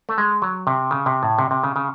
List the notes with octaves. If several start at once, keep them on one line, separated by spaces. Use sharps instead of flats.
A3
G#3
F#3
C3
C#3
C3
A2
C3
C3
C#3
C#3